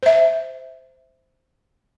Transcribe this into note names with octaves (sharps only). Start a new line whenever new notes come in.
C5 E5